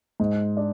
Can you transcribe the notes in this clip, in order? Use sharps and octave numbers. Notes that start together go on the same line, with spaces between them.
G#2
D4